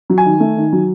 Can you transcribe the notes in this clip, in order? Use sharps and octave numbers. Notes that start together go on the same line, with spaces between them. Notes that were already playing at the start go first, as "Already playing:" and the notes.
F#3
G#5
D#3
A3
D#3
F#3